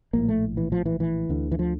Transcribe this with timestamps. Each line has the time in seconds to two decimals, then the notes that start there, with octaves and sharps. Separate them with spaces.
0.13 A#1 A2 A#3
0.29 A3
0.57 E3
0.72 F3
0.86 E3
1.00 E3
1.29 D2 D3
1.52 E3
1.59 F3